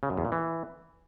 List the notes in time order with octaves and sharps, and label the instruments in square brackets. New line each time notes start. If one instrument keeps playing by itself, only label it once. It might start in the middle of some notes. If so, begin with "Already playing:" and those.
[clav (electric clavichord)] C#3
F#2
E2
A#2
E3